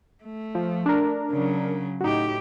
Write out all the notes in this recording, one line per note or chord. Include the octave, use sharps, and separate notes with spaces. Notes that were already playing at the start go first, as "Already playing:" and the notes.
A3
F3
D4 A#4
C#3 F#3
A2 D#4 F#4 G4